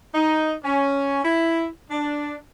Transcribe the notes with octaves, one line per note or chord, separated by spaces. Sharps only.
D#4
C#4
E4
D4